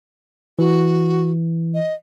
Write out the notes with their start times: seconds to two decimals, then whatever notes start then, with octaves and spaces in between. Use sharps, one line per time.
0.59 E3 F#4
1.74 D#5